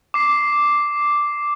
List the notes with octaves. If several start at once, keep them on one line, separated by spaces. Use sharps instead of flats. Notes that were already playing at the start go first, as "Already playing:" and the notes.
D6 C7